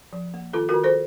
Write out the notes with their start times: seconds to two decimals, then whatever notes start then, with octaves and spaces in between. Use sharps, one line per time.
0.13 F3
0.34 A#3
0.53 D#3 F4 A4
0.69 F#4 A#4
0.74 D#3
0.84 A4 C5